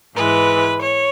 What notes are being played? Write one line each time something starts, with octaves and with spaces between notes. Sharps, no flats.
G#2 E3 G#3 B4
C#5